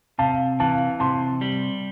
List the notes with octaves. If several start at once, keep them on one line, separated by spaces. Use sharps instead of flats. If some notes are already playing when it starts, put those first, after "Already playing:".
C3 F5 A5
E3 F5 A5
C3 A5 C6
G3